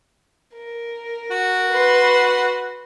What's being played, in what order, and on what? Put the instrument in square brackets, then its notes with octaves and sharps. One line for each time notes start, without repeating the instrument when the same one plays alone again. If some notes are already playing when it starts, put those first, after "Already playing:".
[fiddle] A#4
[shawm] F#4
[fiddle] B4 C6